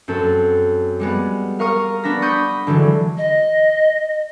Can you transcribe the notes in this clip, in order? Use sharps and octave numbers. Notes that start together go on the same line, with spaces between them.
F#2 C4 A4
G3 G#3 B3
A#4 F5 C#6 D#6 F6
B3 D4 B5 A#6
B5 C#6 D#6 G6 A#6
D3 E3 F#3 G#3
D#5